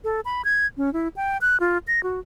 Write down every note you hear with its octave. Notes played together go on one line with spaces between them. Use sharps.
A4
B5
G#6
C#4
E4
G5
F#6
F4
A#6
F#4